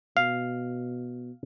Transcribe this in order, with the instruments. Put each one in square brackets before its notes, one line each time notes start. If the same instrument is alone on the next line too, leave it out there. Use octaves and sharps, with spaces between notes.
[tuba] B2 [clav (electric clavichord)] F5